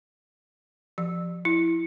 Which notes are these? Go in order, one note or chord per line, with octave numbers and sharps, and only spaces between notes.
F3
E4